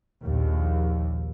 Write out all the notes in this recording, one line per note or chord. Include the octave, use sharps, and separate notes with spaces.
A#1 D#2